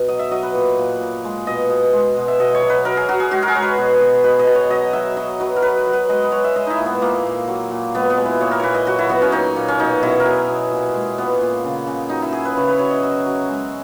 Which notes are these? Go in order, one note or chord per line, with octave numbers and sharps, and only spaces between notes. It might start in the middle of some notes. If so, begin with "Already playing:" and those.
Already playing: B2
F#3 D#5
E5
F#3 D#5
B4
A#2
A#2
A#2
G#3
B2 D#5
B2
G#3
B2
E5
B2 D#5
C#5
F#3
B4
F#3 A#4
G#4
F#3 F#4
G#4
G#3 F#4
A#4
G#4
G#3 C#5
B4
B2
B2
B2 B4
D#5
B2
C#5
F#3 D#5
F#3 E5
F#3 D#5
F#3 B4
A#4
F#3 B4
B4
F#3
B4
G#3 D#5
B4
G#3 C#5
E5
G#3 D#5
D#4 E4
A#2
B3
A#2 A#3
A#2
F#3
A#2
G#3 B3
B3
G#3
E4
A#2 C#5
A#4
A#2 B4 C#5
D#5
F#3 F#4
E4
F#3 B3
C#4
A#2 D#4
A#2
C#4
B2 D#4
B2 E4
A#4
F#3 G#4
B2
A#2
G#3
A#2 B3
A#2
C#3
C#3
F#3 D#4
E4
F#3 G#4
B4
C#3 C#5
B4
F#3 C#5
D#5
F#3 E5
F#3
G#3